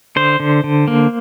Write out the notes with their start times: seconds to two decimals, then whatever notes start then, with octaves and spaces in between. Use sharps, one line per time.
0.16 D3 C5
0.40 D3
0.64 D3
0.88 A#3